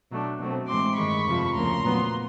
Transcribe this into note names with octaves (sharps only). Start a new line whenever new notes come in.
B2 F#3 A3 D4
B2 F#3 A3 C4
A2 E3 G#3 C4 C6 D6
G2 D#3 G#3 B5 C#6
F2 C3 F3
D2 C#3 F3 A#3 A#5 C6
A#2 F#3 B3